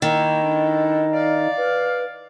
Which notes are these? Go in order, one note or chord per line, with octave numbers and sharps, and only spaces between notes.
D#3 A#3 E4 D#5
D4 E4 A4
D5 F5
B4